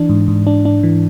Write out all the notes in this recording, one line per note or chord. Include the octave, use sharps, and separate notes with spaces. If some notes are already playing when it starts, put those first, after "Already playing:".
Already playing: E3 D4
G#2
G#2
D4
D4
E3